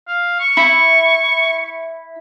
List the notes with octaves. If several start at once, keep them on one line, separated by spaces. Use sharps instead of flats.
F5
C#6
E4